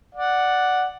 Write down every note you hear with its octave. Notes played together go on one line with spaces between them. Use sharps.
D5 F#5